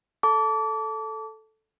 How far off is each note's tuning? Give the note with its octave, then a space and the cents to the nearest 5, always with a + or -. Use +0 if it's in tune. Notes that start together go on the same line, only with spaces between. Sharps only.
A4 -5 A5 +5 D6 -30